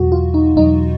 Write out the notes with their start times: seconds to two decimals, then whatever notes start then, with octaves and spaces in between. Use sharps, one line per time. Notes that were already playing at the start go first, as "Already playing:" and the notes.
Already playing: E2 B2 F#3 F#4
0.12 F4
0.34 D#4
0.56 E2 B2 F#3 D#4